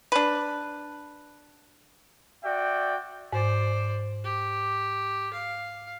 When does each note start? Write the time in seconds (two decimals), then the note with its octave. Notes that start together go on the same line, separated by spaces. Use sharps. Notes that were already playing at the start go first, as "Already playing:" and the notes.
0.12 D4 B4
2.44 F#4 D5 E5 G5
3.33 G#2 C5 D5
4.24 G4
5.33 F5